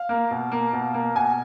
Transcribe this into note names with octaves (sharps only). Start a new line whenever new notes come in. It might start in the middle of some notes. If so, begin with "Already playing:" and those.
Already playing: F5
A#3
B2
A#3
B2
A#3
B2 G#5